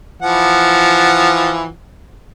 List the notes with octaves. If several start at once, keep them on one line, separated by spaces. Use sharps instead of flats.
E3 F3 F#5